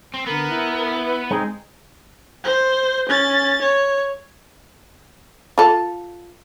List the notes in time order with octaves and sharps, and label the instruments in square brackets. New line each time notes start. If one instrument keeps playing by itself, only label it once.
[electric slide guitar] C4
[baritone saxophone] D3 [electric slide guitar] B3 [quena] A#4
[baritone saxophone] E4
[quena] B4
[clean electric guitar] G#3 C4 D#4 [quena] G#4
[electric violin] C5
C#4 A6
C#5
[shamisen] F4 A4